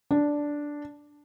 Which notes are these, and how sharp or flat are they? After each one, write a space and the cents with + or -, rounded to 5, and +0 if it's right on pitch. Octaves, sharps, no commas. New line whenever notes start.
D4 -5